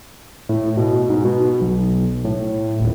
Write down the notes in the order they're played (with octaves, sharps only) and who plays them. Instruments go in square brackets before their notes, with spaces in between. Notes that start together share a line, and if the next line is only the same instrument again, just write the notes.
[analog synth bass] A2
B2
G#2
B2
B1
A2
D#1